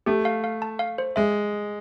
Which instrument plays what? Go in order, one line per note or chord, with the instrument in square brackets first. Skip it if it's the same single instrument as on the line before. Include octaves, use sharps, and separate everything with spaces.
[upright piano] A3 [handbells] G4
[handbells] F5
F5
A5
F5
C5
[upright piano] G#3 [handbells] E5